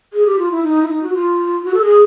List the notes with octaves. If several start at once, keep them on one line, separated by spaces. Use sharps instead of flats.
G#4
G4
F4
E4
D#4
E4
D#4
F#4
F4
F#4
A4
G#4